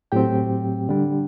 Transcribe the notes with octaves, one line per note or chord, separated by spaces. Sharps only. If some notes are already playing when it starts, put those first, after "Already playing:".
A2 F#3 C4 G4 G5
D3 G3 D4